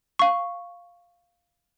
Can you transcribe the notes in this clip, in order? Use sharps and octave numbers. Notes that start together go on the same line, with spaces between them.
F5 C#6